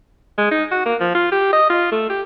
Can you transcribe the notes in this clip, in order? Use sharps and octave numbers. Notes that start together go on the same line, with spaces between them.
G#3
D#4
F#4
A#3
F3
F4
G4
D#5
F4
A3
G4